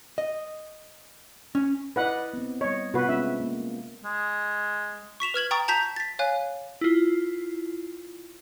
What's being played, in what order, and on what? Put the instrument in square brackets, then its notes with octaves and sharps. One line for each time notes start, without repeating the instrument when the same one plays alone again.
[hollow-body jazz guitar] D#5
C#4
[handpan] E4 D5 D#5 [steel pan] B4 F#5
[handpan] B3 C4
[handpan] G3 D#5 [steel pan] C#5
[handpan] C3 B3 F4 [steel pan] F#4 B4
[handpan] G#3 C4 C#4 [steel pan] E5
[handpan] A#3
[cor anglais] G#3
[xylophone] C#6 B6 E7 F7
B4 F6 G#6 F#7
G5 A#5 C#6 D#6 A6 D7
A5 A#5 G6 B6 F7
A6 B6
C#5 F5 G#5 F#6
[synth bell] E4 F4